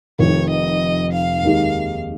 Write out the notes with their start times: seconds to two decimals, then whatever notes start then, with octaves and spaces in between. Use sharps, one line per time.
0.19 F1 F2 D#3 C#5
0.50 D#5
1.13 F5
1.43 D#2 D#3 G#3 D#4 G4